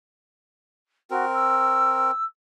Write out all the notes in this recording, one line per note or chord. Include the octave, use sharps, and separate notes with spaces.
C4 F#4 A#4
E6